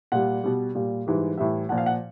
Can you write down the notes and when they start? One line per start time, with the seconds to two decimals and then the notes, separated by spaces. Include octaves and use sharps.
0.12 A#2 G3 F#5
0.44 B2 G3
0.75 A#2 G3
1.07 G#2 E3 G3
1.38 A2 E3 G3 E5
1.69 A#2 F3 F#5
1.78 F5
1.86 F#5